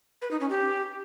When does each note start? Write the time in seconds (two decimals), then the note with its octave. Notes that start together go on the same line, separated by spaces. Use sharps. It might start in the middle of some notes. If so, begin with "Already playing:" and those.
0.22 B4
0.31 D#4
0.40 C#4
0.50 G4